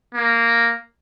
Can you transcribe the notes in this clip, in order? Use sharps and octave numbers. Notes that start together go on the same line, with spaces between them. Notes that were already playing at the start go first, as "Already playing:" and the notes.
A#3